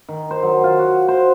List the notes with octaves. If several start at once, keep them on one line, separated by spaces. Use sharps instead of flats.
D#3
C5
F#3
F4
F#4
C5